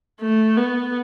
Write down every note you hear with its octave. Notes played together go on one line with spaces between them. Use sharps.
A3
B3